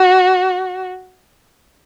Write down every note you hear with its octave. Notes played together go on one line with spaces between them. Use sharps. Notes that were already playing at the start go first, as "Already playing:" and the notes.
Already playing: F#4